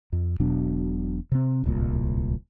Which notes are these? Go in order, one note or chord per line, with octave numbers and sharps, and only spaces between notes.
F2
E1 B2 F#3 D4
C3 C4
D1 C2 A#2